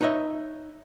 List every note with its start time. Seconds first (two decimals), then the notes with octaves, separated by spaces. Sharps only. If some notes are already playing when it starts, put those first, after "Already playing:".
0.01 D#4 B4 C#5 D#5 E5